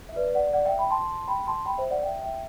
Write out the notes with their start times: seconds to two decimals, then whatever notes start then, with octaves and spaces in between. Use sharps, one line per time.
0.09 E5
0.16 B4 D5
0.34 D5 F#5
0.53 D5 F#5
0.65 E5 G5
0.78 G5 B5
0.91 A5 C6
1.28 G5 B5
1.47 A5 C6
1.66 G5 B5
1.78 C5 E5
1.90 D5 F#5
2.03 E5 G5
2.22 E5 G5